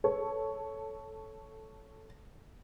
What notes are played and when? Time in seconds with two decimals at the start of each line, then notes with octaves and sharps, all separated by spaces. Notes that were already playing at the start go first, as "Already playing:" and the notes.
0.04 A4 C#5